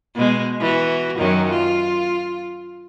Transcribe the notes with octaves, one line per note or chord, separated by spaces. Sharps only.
B2 G#3
E3 F#4
F#2 D#3 F#3
F4